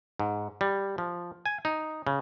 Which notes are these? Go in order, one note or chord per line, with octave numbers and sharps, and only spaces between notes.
G#2
G3
F3
G#5
D#4
C#3